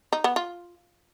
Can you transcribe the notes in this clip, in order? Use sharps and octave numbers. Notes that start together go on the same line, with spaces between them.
D#4
B3
F4